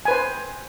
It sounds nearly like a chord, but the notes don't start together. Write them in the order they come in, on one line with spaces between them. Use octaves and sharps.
G#5 B4 C5